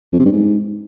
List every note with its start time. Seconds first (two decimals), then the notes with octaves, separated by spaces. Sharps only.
0.13 F2
0.19 C3
0.26 G2
0.32 G#2